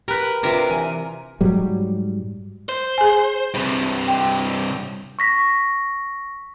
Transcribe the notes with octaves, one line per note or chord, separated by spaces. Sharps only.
G4 A#4 B4
C3 D4 F4 A#4 B4
E3 G#5
G#2 F#3 G3
C5
G#4 G#5
G2 C3
G5
C#6 A#6 B6